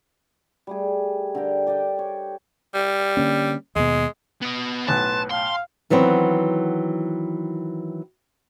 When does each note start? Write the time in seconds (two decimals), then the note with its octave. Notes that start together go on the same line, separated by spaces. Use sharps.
0.67 G3 A3 G#4
1.35 D3 A#4 G5
1.67 G4 D5 D#5 G5
1.99 C#5
2.74 G3
3.17 D3 A#3 C#4
3.76 D#2 B2 G#3
4.42 B3 D#5
4.87 B1 A2 B4 G#5 A5 C6 F#6
5.31 F5 G5 A5 C6
5.90 D#3 E3 F#3 B3 C4